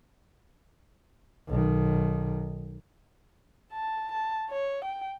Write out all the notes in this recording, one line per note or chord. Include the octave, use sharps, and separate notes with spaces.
B1 D#3
A5
A5
C#5
G5